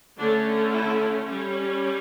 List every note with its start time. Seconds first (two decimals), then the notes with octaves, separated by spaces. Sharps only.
0.18 D3 A3 C#4 D4
0.73 E4
1.26 G3 C#4